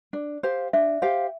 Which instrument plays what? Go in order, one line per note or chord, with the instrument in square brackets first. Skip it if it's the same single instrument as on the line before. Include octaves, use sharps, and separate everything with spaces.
[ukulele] D4
G4 C5 F5
[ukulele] D4 [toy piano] E5
[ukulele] G4 C5 F5